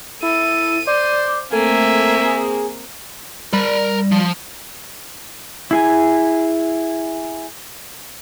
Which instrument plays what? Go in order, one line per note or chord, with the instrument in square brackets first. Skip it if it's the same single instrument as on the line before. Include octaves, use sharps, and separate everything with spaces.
[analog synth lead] E4 [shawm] A4 [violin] D#7
[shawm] C5 [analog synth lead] D5
[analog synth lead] A3 [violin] A#3 C4 [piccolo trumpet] E5 [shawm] G#5
[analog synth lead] G#4
[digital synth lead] G3 [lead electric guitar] A#4 B5
[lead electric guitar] F3
[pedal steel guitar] E4 G#4 G#5